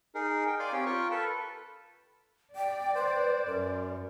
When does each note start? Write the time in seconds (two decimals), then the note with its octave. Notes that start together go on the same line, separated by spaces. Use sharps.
0.15 D#4 G#4 A#4
0.47 G5
0.60 D5 F5 G#5 C6 D6
0.72 C4 G4 C#5 G5
0.86 F4 A#4 G5 C#6
1.11 A4 B4 A5
2.56 D5 G5
2.95 B4 C5
3.46 F#2 A#4